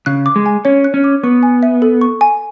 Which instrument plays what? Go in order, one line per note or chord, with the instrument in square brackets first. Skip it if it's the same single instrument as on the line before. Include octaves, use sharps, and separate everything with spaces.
[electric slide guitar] C#3 [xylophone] F#6
[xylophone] D6
[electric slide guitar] G#3
[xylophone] G#5
[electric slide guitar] C#4 [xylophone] C#5
[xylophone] F#6
[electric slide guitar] C#4
[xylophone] D6
[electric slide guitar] B3 [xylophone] C#6
[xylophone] G#5
E5
A4
C#6
G#5